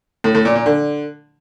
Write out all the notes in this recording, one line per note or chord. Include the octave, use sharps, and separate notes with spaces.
A2
A2
A#2
A#2
D3